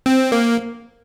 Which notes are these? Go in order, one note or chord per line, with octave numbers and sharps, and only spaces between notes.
C4
A#3